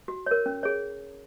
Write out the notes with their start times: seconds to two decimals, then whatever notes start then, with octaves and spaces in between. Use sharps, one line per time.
0.08 F#4
0.26 A#4 C#5
0.46 C#4
0.63 G#4 C#5